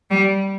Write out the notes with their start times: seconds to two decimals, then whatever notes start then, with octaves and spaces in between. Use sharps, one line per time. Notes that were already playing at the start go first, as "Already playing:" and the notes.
0.10 G3